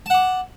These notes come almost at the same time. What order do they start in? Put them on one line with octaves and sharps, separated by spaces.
A5 F#5 D6